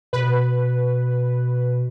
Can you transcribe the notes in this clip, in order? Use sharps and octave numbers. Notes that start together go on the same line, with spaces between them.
B2 B4